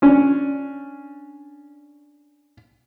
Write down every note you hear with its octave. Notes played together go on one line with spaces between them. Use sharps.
C#4 D4